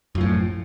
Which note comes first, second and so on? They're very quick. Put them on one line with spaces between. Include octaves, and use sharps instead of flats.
F#2 F3 A2